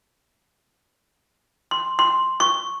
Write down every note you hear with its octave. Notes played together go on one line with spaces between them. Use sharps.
C6
C6
C#6